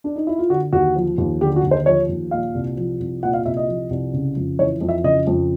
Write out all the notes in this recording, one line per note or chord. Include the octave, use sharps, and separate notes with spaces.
D4
D#4
E4
F4
D3 F#4
D#2 F#4
F3
D#2
D3 G4
F#4
D#2
C5
F3 C#5
D#2
A#2 F5
C2
F3
C2
A#2 F#5
F5
C2 E5
D#5
F3
C2
C#3
F2
E3 C#5
F2
E5
C#3 D#5
F2